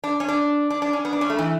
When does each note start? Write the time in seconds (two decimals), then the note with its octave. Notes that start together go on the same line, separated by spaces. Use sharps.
0.04 D4
0.20 C#4
0.28 D4
0.70 D4
0.82 D4
0.93 C#4
1.05 B3
1.13 D4
1.21 C#4
1.30 A3
1.39 E3